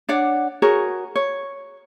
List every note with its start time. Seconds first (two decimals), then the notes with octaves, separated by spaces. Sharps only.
0.09 D4 C#5 D5 F#5
0.62 F#4 G#4 A#4 C#5
1.15 C#5